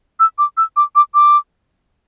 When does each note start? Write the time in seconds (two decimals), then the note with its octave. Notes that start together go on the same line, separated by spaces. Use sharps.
0.20 E6
0.38 D6
0.57 E6
0.76 D6
0.95 D6
1.14 D6